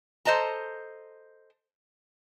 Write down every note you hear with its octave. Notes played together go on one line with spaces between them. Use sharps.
A4 C5 D#5 A5 A#5